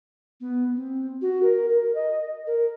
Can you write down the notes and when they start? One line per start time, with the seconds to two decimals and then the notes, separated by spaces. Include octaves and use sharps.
0.40 B3
0.76 C4
1.22 F#4
1.43 A#4
1.69 A#4
1.95 D#5
2.47 A#4